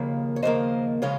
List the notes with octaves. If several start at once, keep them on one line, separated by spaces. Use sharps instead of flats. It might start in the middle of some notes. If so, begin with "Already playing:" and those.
Already playing: D#2 C#3 F3 A#3
C#5
D#2 C#3 F3 A#3 C5 D#5
C#3 F3 G#3 C#5 F5